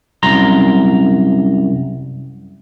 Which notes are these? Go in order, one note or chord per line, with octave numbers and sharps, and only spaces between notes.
C2 F#2 A#5 C6